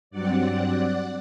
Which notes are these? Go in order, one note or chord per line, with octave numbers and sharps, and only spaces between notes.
G2 F#3 C4 D5 F#5